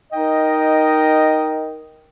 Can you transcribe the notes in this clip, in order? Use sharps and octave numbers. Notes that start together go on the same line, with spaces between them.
D#4 A#4 D#5 G5